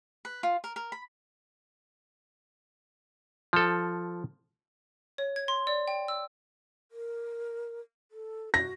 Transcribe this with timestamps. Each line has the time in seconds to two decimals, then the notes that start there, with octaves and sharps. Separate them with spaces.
0.25 B4
0.43 F4
0.64 A#4
0.76 A#4
0.92 B5
3.53 F3 A4
5.18 C#5
5.36 G#6
5.48 C6
5.67 D5
5.88 G5
6.08 E6
6.92 A#4
8.11 A4
8.54 F#4 A#6